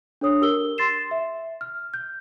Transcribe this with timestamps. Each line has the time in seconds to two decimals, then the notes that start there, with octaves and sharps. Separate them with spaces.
0.21 D4 A4 C#5 D#6
0.41 G4 A#4 E6 G7
0.78 C6 A6 C7 E7
1.11 E5
1.61 F6
1.94 G6